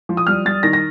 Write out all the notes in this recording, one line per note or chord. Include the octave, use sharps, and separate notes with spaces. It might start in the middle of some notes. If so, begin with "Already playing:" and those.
F3
D#6
G3 F6
G3 A6
D#3 A#6
A#6